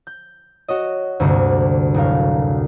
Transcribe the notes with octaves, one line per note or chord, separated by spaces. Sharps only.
G6
F#4 C#5 D#5
D2 G2 C3 A3 A#3
F#1 A2 A#4 F5